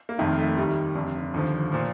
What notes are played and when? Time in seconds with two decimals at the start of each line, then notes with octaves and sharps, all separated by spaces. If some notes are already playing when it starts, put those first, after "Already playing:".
0.09 A#3
0.18 F1 F2 D#3 A3
0.38 A3
0.57 D#2 D#3 G3
0.95 F1 F2 D3
1.34 D#2 D3 F3
1.72 A#2 F3